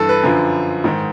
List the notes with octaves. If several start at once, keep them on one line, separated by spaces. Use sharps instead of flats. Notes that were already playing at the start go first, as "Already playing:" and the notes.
Already playing: G2 E3 A4
B4
F#2 D3 F3
G#2 D#3